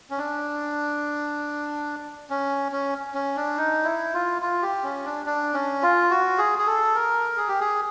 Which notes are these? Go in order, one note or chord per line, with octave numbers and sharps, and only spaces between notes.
C#4
D4
C#4
C#4
C#4
D4
D#4
E4
F4
F4
G4
C#4
D4
D4
C#4
F4
F#4
G#4
G#4
A4
A#4
G#4
G4
G#4